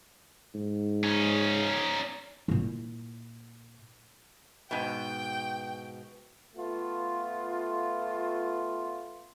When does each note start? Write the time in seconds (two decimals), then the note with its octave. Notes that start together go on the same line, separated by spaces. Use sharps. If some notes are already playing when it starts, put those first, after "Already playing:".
0.55 G#2
1.03 C#4 D#4
2.48 A#2 E4
4.71 G#2 B2 G5
6.56 A3 B3 F4